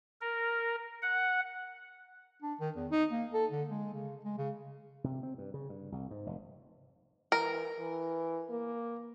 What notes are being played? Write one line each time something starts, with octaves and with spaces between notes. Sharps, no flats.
A#4
F#5
D4
D#3
E2
D#4
A#3
A4
D3
G#3
C#3
G#3
C#3
C3
C4
G2
C#3
G2
C2
G#2
F1
E3 A#4
E3
A#3